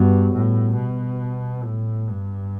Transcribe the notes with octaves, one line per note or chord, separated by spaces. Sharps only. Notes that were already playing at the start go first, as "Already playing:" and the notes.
Already playing: G2 G3 B3 F#4
A2
B2
A2
G2